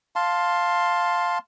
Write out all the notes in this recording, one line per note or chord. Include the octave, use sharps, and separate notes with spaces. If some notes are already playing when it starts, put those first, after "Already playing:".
F5 A5 C6